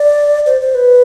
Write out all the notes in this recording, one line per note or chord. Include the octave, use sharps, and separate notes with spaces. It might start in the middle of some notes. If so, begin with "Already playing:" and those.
Already playing: D5
C5
C5
B4